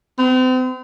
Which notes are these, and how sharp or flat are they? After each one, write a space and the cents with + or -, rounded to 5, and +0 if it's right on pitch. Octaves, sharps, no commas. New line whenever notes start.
C4 -40